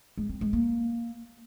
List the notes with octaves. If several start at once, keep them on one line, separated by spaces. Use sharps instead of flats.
G#3
C4
G#3
A#3